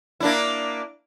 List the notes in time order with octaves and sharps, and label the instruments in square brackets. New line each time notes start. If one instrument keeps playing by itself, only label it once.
[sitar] A#3 D4 E4